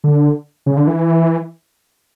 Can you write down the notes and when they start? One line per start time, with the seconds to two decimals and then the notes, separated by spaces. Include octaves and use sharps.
0.04 D3
0.66 C#3
0.77 D3
0.87 E3